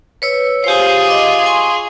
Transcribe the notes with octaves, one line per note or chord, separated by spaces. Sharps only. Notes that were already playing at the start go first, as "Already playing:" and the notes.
B4 C#5 E6
F4 G4 G#4 C5
D#5 D6
G#5 C6 C#6